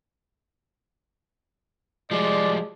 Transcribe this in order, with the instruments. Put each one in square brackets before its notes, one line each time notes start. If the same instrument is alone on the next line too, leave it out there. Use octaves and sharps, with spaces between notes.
[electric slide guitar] F3 G3 [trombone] G#3 [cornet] D5